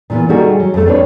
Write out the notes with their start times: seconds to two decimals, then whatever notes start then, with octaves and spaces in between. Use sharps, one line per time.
0.10 A#2 E3 B3
0.29 D#3 G3 A3 F#4 G#4 A#4
0.60 F#3
0.74 F2 A3
0.87 C4 D4 B4 C#5